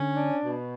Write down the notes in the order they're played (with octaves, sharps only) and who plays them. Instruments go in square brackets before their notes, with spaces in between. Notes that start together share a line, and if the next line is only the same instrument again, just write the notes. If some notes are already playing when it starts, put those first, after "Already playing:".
Already playing: [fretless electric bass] D3 [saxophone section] C#4
[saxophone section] D4
B2